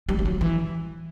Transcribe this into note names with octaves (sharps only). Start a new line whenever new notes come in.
G3
G3
F#3
E3